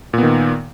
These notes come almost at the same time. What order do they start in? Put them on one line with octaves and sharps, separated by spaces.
A#2 B3 D#3